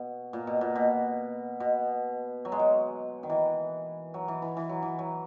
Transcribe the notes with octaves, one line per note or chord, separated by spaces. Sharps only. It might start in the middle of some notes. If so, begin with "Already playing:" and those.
Already playing: B2
A#2
B2
A#2
B2
B2
F#3
G#3
F#3
D#3
E3
F#3
E3
E3
E3
F#3
E3
F#3